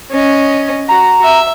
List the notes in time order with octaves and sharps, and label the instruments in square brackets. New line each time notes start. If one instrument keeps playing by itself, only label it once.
[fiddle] C#4 D#5
[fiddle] F#4 [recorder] A#5
[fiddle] E5